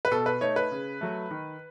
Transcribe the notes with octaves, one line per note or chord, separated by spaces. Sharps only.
B4
B2 A4
B4
A3 D#4 C#5
B4
C#3
F#3 A3
D#3